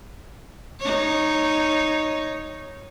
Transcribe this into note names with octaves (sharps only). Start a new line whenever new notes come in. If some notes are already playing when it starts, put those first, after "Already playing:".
D#4 C#5